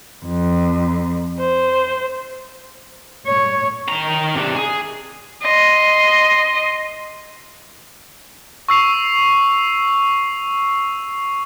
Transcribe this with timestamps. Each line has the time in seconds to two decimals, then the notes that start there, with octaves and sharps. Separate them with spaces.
0.26 F2
1.40 C5
3.27 C#5
3.88 D#3 A#5
4.35 C3 D4
4.55 G#4
5.42 D#5 C6
8.68 C#6 E6 C7 F7